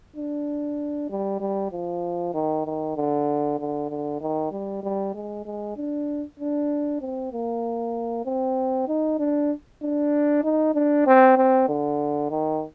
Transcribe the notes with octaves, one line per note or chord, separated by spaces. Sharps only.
D4
G3
G3
F3
D#3
D#3
D3
D3
D3
D#3
G3
G3
G#3
G#3
D4
D4
C4
A#3
C4
D#4
D4
D4
D#4
D4
C4
C4
D3
D#3